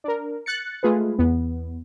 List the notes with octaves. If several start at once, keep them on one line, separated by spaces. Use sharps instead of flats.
D4 A#4
F#6 A6 C#7
G#3 A3 F4 G#4 B4
E2 B3